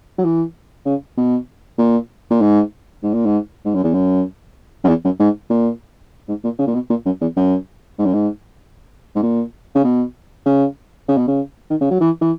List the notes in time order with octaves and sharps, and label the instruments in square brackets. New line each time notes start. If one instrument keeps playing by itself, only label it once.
[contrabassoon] F#3
E3
C#3
B2
A#2
A#2
G#2
G#2
A#2
G#2
G#2
F#2
E2
F#2
F#2
E2
F#2
G#2
A#2
G#2
A#2
C#3
A#2
B2
A#2
F#2
E2
F#2
G#2
F#2
G#2
G#2
A#2
C#3
B2
C#3
C#3
B2
C#3
D#3
C#3
F#3
E3
E3